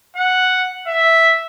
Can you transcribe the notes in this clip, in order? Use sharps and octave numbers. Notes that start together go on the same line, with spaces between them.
F#5
E5